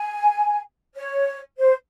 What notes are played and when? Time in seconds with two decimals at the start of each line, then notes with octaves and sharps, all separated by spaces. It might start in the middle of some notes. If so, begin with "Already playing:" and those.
Already playing: G#5
0.95 C#5
1.58 C5